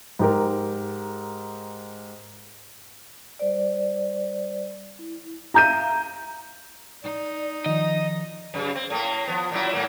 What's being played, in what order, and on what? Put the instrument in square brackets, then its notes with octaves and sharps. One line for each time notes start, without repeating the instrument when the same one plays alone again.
[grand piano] G#2 G4 A#4
[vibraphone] G3 C5 D5
E4
[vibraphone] E5 F5 [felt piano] A#5 G6 D#7
[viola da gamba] D#4 [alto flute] D5
[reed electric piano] D#3 F3 [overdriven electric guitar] D#5
[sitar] F#2 C#3
C4
A2 A#3
F3 B3
A#2 F#3 E4
G#2 F#3 A#3